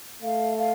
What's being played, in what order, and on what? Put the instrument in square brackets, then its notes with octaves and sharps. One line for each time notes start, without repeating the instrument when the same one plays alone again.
[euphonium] A3 [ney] F5
[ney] F5